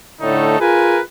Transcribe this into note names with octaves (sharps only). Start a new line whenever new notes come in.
A2 D3 A3 D#4 A4
F4 G#4 A#4 B4 G#5